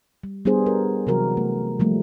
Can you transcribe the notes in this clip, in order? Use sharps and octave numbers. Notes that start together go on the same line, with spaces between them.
G3
G3 B3 D4 G#4 C5
A#4
C3 E3 F#3 F#4 A#4
A3
F3 G3 A3 A#3